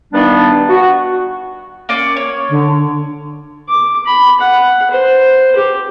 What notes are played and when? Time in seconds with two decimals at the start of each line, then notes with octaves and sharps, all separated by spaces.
0.13 G2 D#3 G3 B3 D4
0.69 F#4
1.89 A#3 C#4 D5
2.17 C#5
2.49 D3
3.68 D6
4.06 B5
4.41 F#5
4.91 C5
5.56 G4